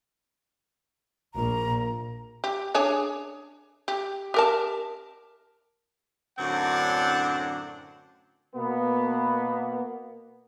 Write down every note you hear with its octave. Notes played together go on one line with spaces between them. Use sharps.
A#1 A#2 A#5
G4
D4 G#4 C#5
G4
G4 A#4 A5
F#2 A2 D3 C4 D4 F#5
B2 A#3 B3